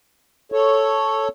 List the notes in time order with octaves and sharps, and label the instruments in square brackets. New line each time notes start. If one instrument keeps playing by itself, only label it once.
[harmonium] A4 C#5